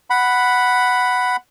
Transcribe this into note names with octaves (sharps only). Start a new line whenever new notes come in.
F#5 B5